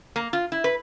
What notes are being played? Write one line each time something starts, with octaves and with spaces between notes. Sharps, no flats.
A#3
F4
E4
B4